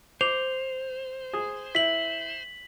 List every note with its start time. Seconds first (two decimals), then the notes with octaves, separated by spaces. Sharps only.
0.21 C5 D6 F7
1.33 G#4
1.75 E4 B6 F#7